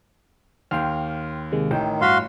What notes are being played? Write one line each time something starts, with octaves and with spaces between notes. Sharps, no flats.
D#2 G5 C6 F6
C3 D#3 G#3
A1 D#3 G5
G2 F#4 F5 C6 B6